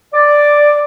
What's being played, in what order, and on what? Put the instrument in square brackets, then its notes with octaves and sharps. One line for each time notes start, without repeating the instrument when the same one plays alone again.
[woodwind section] D5